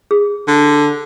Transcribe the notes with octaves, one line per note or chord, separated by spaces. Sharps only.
G#4
D3